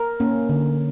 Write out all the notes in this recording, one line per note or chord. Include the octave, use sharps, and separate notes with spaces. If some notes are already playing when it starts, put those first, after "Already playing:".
Already playing: A#4
A#3 C#4
D3